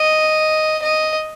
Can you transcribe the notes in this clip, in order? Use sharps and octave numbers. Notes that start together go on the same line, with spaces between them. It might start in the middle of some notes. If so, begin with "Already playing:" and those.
Already playing: D#5
D#5